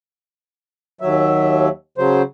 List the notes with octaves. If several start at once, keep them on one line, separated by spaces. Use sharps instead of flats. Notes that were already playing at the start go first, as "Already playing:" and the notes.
D#2 F#3 E5
C#3 F#3 C5